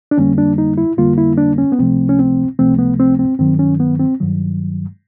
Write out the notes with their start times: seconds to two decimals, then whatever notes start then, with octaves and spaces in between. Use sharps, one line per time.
0.11 D4
0.18 F2 D3 G3 A#3 C#4
0.38 D4
0.58 D#4
0.78 E4
0.97 F2 D3 G3 A#3 F4
1.18 E4
1.38 D4
1.58 C#4
1.72 B3
1.78 C#2 C3 F3 A3 C4
2.09 C#4
2.19 C4
2.59 C#2 C3 F3 A3 C4
2.78 B3
2.99 C4
3.19 C4
3.39 G2 D#3 F#3 C4
3.59 C#4
3.80 B3
3.99 C4
4.20 G2 D#3 F#3